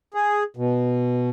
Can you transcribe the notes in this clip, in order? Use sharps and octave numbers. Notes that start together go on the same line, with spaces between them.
G#4
B2